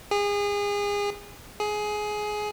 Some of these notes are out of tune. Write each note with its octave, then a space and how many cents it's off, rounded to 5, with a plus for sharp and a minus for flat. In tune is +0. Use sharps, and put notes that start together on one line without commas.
G#4 -30
G#4 +15